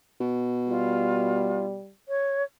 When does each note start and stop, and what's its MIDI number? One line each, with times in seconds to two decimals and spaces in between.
0.20 1.79 47
0.68 1.92 55
0.68 1.65 65
2.08 2.43 73